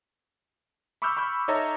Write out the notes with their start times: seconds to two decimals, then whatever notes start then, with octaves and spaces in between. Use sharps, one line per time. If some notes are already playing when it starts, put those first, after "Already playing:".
1.02 B5 C#6 D6 E6 F6 G6
1.17 B5 C#6 D6 G6
1.48 D#4 A4 C#5 D#5 E5 A#5